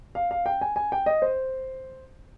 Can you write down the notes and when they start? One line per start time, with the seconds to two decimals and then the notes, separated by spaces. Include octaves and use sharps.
0.15 F5
0.31 F5
0.46 G5
0.61 G#5
0.76 G#5
0.92 G5
1.06 D#5
1.22 C5